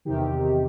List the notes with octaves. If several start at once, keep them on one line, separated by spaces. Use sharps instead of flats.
E2 C3 D#3 G4